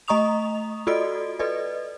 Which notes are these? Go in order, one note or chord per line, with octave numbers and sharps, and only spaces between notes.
A3 D#5 A#5 C#6 D#6 F7
F4 F#4 A4 D5 D#5 D7
A4 B4 D5 D#5